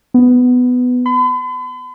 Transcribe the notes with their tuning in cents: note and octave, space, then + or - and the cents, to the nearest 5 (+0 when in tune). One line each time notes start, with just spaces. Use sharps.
B3 +10
B5 +45